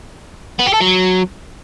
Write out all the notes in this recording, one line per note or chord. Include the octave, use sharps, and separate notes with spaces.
B3
G4
A4
F#3